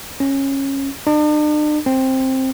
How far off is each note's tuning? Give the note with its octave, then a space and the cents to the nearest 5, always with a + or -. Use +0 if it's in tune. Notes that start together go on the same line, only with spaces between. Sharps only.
C#4 -20
D4 +45
C4 +10